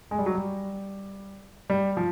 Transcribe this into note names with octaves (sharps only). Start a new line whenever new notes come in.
G#3
G3
F#3
G3
G3
F3